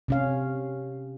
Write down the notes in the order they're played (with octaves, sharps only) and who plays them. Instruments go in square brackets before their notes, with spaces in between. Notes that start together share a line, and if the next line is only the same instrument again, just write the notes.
[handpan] C3 C#4 F5